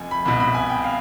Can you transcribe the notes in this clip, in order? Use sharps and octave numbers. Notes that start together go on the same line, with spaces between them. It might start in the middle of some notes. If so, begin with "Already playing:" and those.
Already playing: F1 F2 G#5
B5
C2 B2 B5
B5
G#5
G5
F5